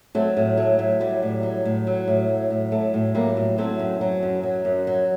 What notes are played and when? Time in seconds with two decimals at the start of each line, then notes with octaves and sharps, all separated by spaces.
0.15 F#3 A3 C4
0.37 A2
0.57 F#3 A3
0.79 A2
1.00 F#3 G3
1.23 A2
1.43 F#3
1.65 A2
1.87 F#3
2.08 A2
2.29 F#3
2.50 A2
2.72 F#3 A3
2.94 A2
3.15 F#3 G3 A#3
3.37 A2
3.58 F#3 A3 C4
3.79 F#2
4.01 F#3
4.23 F#2
4.43 F#3
4.65 F#2
4.87 F#3